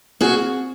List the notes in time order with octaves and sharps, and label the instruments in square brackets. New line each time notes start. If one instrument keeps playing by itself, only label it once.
[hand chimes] C4 [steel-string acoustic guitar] F#4 G#4